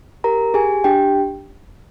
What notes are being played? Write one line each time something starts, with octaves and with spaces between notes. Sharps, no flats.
G4 A#4 A#5
G4 G#4 G#5
D4 G4 G5